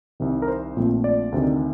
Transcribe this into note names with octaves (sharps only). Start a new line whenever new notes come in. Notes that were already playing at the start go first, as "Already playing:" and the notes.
C2 C3 D#3
A#4
C5
A#1 A#2 A3 C4
D5
D2 C3 D#3